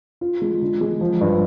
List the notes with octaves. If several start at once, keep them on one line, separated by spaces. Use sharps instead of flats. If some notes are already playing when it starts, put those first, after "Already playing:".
F4
G#3
D3
G#3
F3
G2